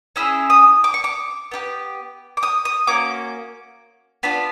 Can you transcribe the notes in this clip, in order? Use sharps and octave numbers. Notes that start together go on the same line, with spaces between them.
C#4 E4 G#4 E6
D#6
D6
C#6
D6
B3 E4 G4
D6
D#6
D#6
A#3 C#4 F#4 D6
B3 D4 F4 B5